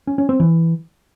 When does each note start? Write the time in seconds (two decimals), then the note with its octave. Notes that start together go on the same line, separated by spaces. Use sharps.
0.07 C#4
0.18 C#4
0.29 C4
0.40 E3